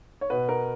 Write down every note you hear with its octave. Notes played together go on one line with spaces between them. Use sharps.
C#5
B2 B4
A#4